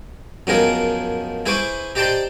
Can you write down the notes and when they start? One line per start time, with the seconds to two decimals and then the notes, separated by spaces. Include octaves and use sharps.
0.47 F#2 F3 B3 D#4 G#4 A#4
1.46 E4 G#4 B4 C5 C#6 D6
1.95 D#4 G4 C5 D5 A5 C6